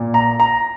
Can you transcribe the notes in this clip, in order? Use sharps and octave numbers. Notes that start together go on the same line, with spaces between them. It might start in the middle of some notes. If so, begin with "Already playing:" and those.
Already playing: A#2
A#5
A#5